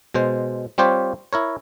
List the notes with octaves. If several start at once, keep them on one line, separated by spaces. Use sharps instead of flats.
B2 G#3 C5
G3 C4 F4 G4 C5 C#5
E4 A#4 C#5